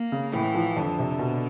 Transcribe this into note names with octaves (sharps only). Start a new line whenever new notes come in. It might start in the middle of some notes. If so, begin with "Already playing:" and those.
Already playing: A#3
C#3
A2 E3
F3
F2 D3
C3
B2